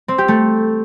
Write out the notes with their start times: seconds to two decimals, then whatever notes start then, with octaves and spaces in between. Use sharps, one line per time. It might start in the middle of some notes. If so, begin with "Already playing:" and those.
0.08 C4
0.18 G4
0.28 A3